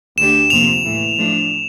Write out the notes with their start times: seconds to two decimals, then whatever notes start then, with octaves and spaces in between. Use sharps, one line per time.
0.17 D2 D3 A3 D4 G4 E7
0.50 F2 C3 F3 A#3 F7
0.85 A2 E3 A3
1.18 F3 A3 D4